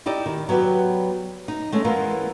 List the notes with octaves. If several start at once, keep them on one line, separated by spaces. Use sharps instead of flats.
D#4 E4 G4 D5 D#5
D#3
F#3 B3 G4 B4 D5
D#4
G#3 A3 C#4
E3 G#3 B3 E4 F4 A#4